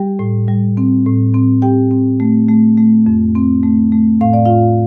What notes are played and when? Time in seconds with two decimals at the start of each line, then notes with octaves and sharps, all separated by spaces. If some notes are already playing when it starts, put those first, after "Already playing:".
Already playing: G3 G4 G5
0.19 A2
0.48 G3
0.77 C4
1.06 A2
1.34 C4
1.62 C4 G4 G5
1.91 C4
2.20 A3
2.48 A3
2.78 A3
3.06 F2
3.35 C4
3.63 A3
3.92 A3
4.21 A2 F5
4.33 D5
4.45 A2 F4 F5